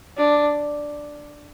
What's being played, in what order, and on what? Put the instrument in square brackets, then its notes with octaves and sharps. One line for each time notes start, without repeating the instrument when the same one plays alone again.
[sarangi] D4